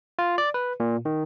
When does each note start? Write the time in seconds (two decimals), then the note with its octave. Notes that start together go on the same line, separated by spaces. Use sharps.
0.19 F4
0.38 D5
0.54 B4
0.80 A#2
1.05 D#3